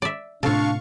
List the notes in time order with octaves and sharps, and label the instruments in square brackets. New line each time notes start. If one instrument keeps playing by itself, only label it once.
[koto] D5 E5
[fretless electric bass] A2 C3 [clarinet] D4 [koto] F4 A4 [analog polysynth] F5 C#6